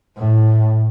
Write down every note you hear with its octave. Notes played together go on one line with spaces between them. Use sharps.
A2